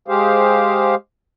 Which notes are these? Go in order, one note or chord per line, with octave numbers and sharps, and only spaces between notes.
G#3 G4 G#4 C5 F5